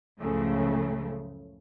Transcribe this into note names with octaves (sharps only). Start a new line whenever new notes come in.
C#2 F#2 A2 C#3 F3 A3